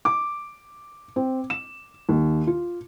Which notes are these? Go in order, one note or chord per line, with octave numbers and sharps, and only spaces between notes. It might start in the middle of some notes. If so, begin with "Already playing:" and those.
D6
C4
E7
D#2
F4